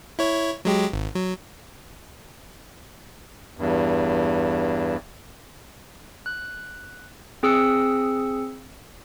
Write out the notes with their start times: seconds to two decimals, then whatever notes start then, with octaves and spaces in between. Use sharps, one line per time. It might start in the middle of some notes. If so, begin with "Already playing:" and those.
0.19 E4 C#5
0.65 F#3 G#3 G4
0.93 G#1
1.15 F#3
3.57 E2 G2
6.26 F#6
7.43 C4 G#4 D#6 E6 C#7